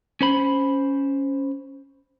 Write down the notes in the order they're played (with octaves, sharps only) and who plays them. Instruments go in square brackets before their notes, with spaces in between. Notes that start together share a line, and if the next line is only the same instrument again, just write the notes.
[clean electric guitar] C#4 C5 B5